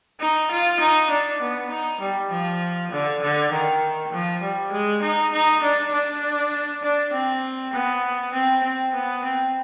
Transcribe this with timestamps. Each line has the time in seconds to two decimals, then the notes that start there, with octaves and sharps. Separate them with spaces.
0.20 D#4
0.51 F4
0.80 D#4
1.11 D4
1.42 B3
1.71 D#4
2.01 G3
2.31 F3
2.92 D3
3.22 D3
3.52 D#3
4.13 F3
4.42 G3
4.72 G#3
5.02 D#4
5.33 D#4
5.63 D4
5.93 D4
6.83 D4
7.13 C4
7.73 B3
8.33 C4
8.64 C4
8.94 B3
9.24 C4